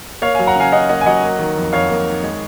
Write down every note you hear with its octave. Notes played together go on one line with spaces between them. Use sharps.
A#3 C#5 F5
F#3 F5 G#5
F#5 A#5
C#3 F5 G#5
C#4 D#5 F#5
A#3 D#5 F#5
G#5
F#3 D#5 F#5
A#3
D#3
F2
F2 C#5 F5
A#3
D#3
G#3